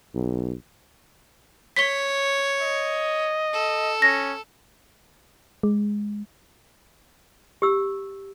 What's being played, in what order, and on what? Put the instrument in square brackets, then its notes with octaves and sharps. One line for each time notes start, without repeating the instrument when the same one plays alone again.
[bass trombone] B1
[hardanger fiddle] C#5 [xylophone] B6 G7
[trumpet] D#5
[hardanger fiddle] A4
[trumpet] C#4 [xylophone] A#6
[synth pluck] G#3
[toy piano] G4 E6